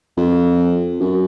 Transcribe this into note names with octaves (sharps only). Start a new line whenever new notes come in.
F2
F#2